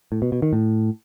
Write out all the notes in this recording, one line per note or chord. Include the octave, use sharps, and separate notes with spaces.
A2
B2
B2
D#3
A2